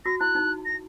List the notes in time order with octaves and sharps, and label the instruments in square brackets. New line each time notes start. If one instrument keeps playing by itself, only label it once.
[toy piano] F#4 [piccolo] A#6
[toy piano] E4 [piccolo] F#6
[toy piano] D#4
[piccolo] A#6